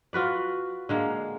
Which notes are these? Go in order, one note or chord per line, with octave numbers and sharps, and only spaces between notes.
F4 F#4 B4 D5
D3 G#3 A#3